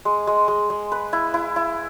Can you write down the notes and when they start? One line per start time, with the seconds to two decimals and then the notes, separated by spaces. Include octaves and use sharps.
0.05 G#3
0.27 G#3
0.48 G#3
0.70 G#3
0.92 B4
1.13 E4
1.34 E4
1.56 E4